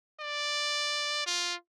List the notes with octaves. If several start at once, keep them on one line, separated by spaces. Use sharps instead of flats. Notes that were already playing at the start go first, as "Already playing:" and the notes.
D5
F4